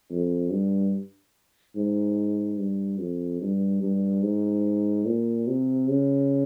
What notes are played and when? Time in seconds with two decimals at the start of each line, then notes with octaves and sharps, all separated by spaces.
0.11 F2
0.52 G2
1.76 G#2
2.59 G2
3.00 F2
3.41 G2
3.83 G2
4.23 G#2
5.06 A#2
5.47 C3
5.88 C#3